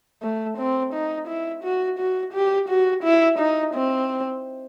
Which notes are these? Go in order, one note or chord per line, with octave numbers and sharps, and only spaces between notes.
A3
C4
D#4
E4
F#4
F#4
G4
F#4
E4
D#4
C4